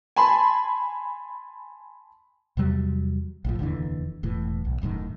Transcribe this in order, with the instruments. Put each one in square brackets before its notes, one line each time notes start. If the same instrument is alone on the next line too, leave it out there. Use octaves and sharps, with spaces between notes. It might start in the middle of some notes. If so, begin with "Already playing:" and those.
[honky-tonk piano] G#5 A5 B5 C6
[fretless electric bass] E2 C3 F#3 G3
A#1 A2 F3
F1 D#2 D3 E3
E1 A2 E3
B1
D#1 F#2 A2 D#3